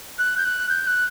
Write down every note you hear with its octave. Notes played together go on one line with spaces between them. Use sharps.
F#6
G6
F#6
G6
F#6